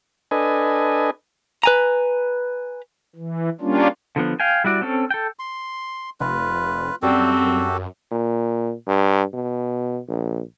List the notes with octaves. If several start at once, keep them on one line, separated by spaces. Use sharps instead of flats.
D4 A4 B4 D#5 G#5
B4 G#5 A#5
E3
G3 A#3 C#4 D4 F4
D3 F3 B3
F5 G5 G#5
G3 E4 F#4 D5
C4 C#4 A4
A4 G5
C6
F1 F4 B4
F#2 G3 C4 F#4 G4 A4
A#2
G2
B2
A#1